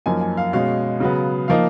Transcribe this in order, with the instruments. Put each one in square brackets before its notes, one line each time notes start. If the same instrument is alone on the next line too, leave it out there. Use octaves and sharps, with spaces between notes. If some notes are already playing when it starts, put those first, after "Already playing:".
[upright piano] F#2 F3 A#3 D#4 G#5
G#5
F5
B2 G#3 C#4 F5
C#3 F#3 B3
F3 A#3 D#4 F5